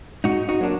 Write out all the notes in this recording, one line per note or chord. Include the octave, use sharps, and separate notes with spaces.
G#2 D#4 F#4
D#4 F#4
F#3 A#3 D4